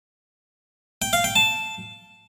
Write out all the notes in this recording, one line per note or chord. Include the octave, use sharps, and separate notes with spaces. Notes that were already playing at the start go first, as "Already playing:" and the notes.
G5
F5
G5
A5